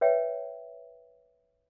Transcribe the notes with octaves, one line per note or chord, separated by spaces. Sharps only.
B4 C#5 E5 G5